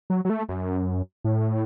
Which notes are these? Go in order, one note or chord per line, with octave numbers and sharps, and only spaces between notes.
F#3
F#3
A3
F#2
A2